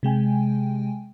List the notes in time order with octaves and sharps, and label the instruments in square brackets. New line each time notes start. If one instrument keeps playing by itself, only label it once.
[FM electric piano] C3 G#3 G5 G#5